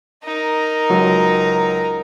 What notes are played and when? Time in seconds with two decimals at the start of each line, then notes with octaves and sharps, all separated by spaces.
0.24 D#4 A#4
0.89 C#2 F#3